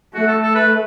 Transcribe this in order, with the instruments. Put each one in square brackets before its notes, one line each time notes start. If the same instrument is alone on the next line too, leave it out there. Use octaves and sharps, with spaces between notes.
[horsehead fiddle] A3 [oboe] F#4
[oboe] A4
A4
B4